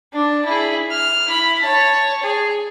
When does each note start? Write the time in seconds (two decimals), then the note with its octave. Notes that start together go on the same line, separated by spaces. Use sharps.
0.13 D4
0.45 E4 G#4
0.91 F6
1.27 E4 B5
1.62 C#5 A5
2.22 G#4